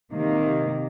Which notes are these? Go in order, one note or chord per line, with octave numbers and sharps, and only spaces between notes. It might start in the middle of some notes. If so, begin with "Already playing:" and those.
C3 D#3 A#3